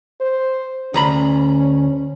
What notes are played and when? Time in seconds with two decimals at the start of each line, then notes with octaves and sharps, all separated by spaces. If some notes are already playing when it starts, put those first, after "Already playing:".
0.21 C5
0.94 D2 C#4 A#5 B5